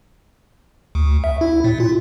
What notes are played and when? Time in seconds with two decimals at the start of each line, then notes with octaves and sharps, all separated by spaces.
0.95 D2
1.24 E5
1.41 E4
1.64 A#2
1.80 F4